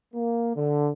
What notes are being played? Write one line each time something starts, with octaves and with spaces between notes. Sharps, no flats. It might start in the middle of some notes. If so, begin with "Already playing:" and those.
A#3
D3